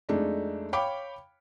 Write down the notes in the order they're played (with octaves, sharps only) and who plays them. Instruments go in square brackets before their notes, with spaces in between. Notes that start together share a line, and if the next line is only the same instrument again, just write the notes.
[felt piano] F2 G#3 A3 D4 D#4
C#5 F5 G5 B5 D6